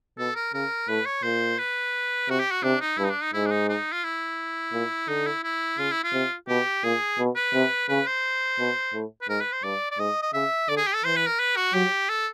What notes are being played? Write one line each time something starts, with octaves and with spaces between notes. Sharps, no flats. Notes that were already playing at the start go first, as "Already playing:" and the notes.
B2 A4
A#4
C#3 A#4
A2 B4
C#5
A#2 C5
B4
C3 F#4
G4
F#4
C3 D4
D#4
G2 E4
D#4
D4
D#4
G#2 E4
D4
D#4
D#4
F4
E4
A#2
D3 D#4
E4
E4
C#3 F4
E4
F4
C3
B2 G4
A#2 G#4
B2
B4
C3
C#3 B4
C5
B2
A2
B4
G#2 A#4
B4
C5
G2 D5
D5
G#2 D#5
D#5
C#3 E5
D3 D5
G#4
G4
A4
E3 C5
B4
A#4
B4
F#4
F#3 G4
A4